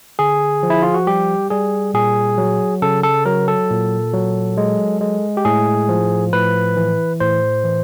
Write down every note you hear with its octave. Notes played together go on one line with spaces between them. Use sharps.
D3 G#4
F3
E4
F4
F#4
G3 G4
G3 G#4
A#2 G#4
F#3
C#3 A4
A4
F#3 A#4
A4
A#2
F#3
G#3
G#3
G4
A2 G#4
F3
A2 B4
E3
A2 C5
E3